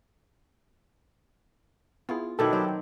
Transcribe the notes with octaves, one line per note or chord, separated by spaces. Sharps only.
B3 E4 F4 G#4
B2 D#3 F#3 D4 E4 G4 A4
F#3 C4